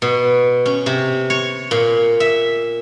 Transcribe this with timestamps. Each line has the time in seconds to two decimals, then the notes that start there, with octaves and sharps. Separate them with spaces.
0.02 B2
0.66 C#4
0.86 C3
1.30 C#5
1.71 A#2
2.20 E5